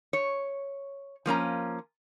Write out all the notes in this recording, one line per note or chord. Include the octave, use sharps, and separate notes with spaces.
C#5
F3 A#3 C#4 A#5